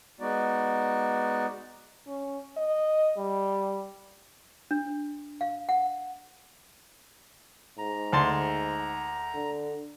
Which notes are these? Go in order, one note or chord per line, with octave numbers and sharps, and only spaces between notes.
G#3 B3 D#4 F#4 D5
C#4
D#5
G3
D4
F5
F#5
G#2 A#5
D2 A5 C6
D3